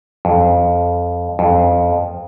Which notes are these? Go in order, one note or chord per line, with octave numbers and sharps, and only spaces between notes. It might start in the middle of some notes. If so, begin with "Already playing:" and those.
F2
F2